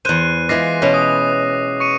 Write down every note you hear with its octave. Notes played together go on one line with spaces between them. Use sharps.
E2 C5 F#6 D#7
E3 G#3 F4 D6 A#6 C7
B2 C#4 B4
D#6
C#6 C#7 D#7